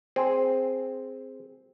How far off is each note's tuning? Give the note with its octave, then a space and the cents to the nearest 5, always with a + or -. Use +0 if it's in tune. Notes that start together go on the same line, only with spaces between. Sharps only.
C4 +0 G#4 +0